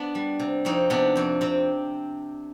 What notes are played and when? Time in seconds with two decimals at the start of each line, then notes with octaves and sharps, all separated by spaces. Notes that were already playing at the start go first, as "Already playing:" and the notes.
Already playing: B3 D4
0.15 G3
0.40 C3
0.65 F2 C4 D#4
0.90 C3 B3 D4
1.16 F2 C4
1.41 C3 C4